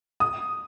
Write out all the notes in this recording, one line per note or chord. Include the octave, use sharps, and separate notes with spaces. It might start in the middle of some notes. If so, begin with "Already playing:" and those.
D#6